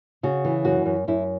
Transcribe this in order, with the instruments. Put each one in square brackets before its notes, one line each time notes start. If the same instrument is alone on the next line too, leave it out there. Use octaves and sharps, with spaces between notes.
[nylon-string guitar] C#3 F#4
E3
F#2 F#4
F#2
F#2 E4